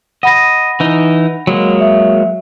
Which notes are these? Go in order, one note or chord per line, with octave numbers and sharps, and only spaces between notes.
D#5 F#5 B5 A#6
E3 D#4
F#3 G#3 A#3
E5